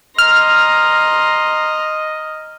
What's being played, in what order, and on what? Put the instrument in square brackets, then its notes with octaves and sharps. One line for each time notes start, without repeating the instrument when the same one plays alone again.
[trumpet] D#5 [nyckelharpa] A#5 C6 [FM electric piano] F6